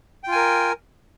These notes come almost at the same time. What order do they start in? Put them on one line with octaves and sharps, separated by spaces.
G5 F4 G#5 A#4